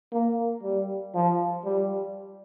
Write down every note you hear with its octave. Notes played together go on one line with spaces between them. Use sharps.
A#3
G3
F3
G3